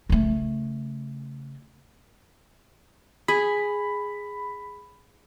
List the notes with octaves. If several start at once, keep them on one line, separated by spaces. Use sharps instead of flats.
C#3 A3
G#4 B5